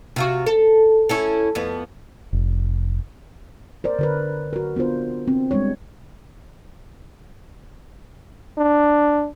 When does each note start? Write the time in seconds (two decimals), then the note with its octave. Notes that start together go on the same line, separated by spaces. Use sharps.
0.16 C3 F4 F#4
0.46 A4
1.09 C#4 E4 A4
1.55 F2 B3
2.33 F1
3.84 A#4 C5 D5
3.99 D3 A#4 B4
4.53 F#4 A#4
4.76 B3 D4 F4 C5
5.28 C4
5.51 G3 G#3 D4 C#5
8.58 D4